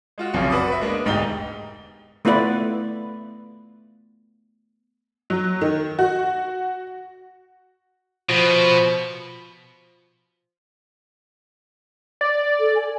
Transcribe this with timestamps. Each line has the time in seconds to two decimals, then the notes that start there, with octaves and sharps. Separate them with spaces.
0.18 G#3 F4 F#4
0.33 F1 B1 F2 C#3
0.50 F#4 B4 D5 D6 D#6
0.68 B4 E5
0.81 G#3 A#3 B3 D4
1.05 E1 D2 G#2 D#4 G4 G7
2.25 A3 B3 E4 F4 B4 D5
5.30 F#3
5.61 D#3
5.99 F#4
8.30 B2 F3
12.21 D5
12.59 A4
12.75 G#5